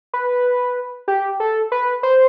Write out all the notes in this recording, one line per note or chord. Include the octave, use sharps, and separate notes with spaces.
B4
G4
A4
B4
C5